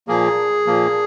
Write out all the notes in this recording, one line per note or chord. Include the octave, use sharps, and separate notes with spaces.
A#2 F3 A#3 G#4
A#2 F3 A#3